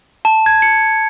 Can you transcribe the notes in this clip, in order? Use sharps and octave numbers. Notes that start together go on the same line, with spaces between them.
A5
G#6
C#7